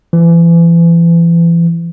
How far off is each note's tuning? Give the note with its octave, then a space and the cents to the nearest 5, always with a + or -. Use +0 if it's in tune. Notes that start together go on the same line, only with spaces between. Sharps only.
E3 +35